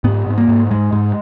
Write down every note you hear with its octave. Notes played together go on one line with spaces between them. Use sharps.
G#2 B3
G#2
A#3
G#2
G#2 G#3
G#2